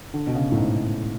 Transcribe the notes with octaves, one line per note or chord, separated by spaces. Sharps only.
D3
B2
C#3
A2
G#2